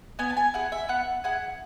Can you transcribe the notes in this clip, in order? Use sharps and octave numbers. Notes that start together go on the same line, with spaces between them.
B3 G#5
A5
G#5
E4 G#4 F#5
E5
B3 F#5
E4 G#4 F#5